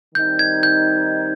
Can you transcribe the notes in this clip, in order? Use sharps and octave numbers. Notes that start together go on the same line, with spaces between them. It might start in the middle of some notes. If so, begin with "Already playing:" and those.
D#3 G3 C4 D#4 G6
G#6
G6